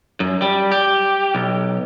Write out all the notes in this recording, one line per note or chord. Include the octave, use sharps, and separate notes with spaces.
F#2
G3
G4
B1